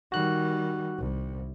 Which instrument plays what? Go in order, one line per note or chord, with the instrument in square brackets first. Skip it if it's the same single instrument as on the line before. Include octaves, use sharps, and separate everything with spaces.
[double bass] D#3 G3 [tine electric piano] F#4 F#6
[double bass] C2